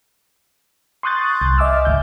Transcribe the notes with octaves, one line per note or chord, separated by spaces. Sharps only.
C6 C#6 D#6 F#6 G6 A6
C2
D#5 E5 G#5 D6 E6 F6
G#1 C#2 G6